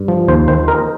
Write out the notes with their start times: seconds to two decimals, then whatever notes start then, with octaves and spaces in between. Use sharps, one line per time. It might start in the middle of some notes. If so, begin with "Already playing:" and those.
Already playing: G2
0.08 F3
0.28 D#2 C5
0.48 D#3 C5
0.68 D#4 A#4